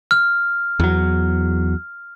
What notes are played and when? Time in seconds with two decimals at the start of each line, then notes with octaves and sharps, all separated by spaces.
0.11 F6
0.80 E2 F#3